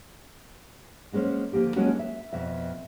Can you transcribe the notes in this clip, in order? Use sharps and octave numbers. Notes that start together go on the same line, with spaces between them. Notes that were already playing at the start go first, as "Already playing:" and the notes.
F#3 G#3 A#3 C#4 C5
D3 F3 A#3 G4 A4
F#3 G#3 A#3 C#4 D4 F#4
E5
F2 B2 E5